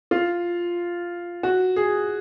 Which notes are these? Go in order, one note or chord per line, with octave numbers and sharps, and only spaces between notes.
F4
F#4
G#4